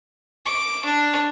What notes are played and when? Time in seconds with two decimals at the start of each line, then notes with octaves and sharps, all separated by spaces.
0.46 D6
0.85 D4